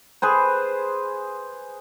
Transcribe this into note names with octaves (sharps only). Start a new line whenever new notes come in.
G#4 B4 C5